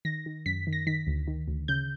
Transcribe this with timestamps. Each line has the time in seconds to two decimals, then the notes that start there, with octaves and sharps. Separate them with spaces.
0.05 D#3 A#6
0.26 D#3
0.46 F#2 B6
0.67 D#3
0.73 A#6
0.87 D#3 B6
1.07 D2
1.28 D#3
1.48 D2
1.68 C#3 G6